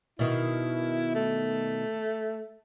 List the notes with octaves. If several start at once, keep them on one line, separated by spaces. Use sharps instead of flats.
B2 D#3 E4
A3